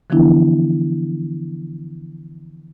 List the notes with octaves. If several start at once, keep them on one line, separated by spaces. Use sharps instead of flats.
D3 E3 F3 B3 D4 E4